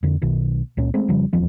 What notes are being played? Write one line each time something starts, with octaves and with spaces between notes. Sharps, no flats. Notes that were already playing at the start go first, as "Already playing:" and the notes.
F2 D3
B1 B2 D#3
C#2 A#2 C#4
G#3 A3 C4
F1 C#3 F3 G3
D#1 E2 F3 C4